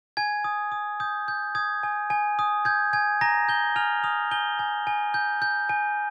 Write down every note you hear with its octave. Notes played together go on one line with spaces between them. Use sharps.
G#5 G#6
D#6
D#6
D#6 G6
G6
D#6 G#6
G#5
G#5
D#6
G6 G#6
G#5 G#6
G#5 A#5 A#6
G6 G7
G#5 F6 F7
D#6 F6 F7
G#5 G6 G7
G#5
G#5
G6
G6
G#5